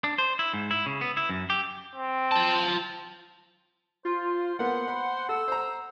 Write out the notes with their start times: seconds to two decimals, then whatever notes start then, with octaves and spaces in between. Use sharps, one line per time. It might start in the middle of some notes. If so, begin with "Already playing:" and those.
0.04 D4
0.18 C5
0.39 E4
0.54 G#2
0.71 E4
0.86 C#3
1.01 B3
1.17 E4
1.29 F#2
1.50 G4
1.95 C4
2.32 F4 A5
4.05 F4 C5
4.59 A#3 B3 C5 F#5
4.88 B5
5.29 A4 E6
5.48 C5 A#5